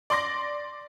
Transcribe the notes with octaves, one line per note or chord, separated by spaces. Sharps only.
D5 C6 D6 A#6